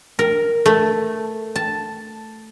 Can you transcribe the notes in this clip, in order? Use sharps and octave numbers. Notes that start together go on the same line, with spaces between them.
A#4
A3
A5